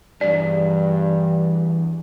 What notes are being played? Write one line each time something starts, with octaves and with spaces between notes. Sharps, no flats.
B1 E2 G2 D5